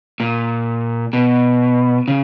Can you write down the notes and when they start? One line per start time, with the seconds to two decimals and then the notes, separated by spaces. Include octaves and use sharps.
0.20 A#2
1.13 B2
2.08 C#3